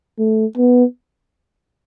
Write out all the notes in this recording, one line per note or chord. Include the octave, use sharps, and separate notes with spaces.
A3
B3